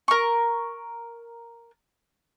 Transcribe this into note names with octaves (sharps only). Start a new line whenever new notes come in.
A#4 C#6